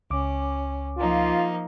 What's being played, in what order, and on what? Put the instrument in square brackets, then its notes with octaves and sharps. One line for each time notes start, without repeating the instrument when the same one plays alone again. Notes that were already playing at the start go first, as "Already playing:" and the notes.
[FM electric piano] C#2 D6 [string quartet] C#4
[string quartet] F3 A#3 D#4 [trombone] F4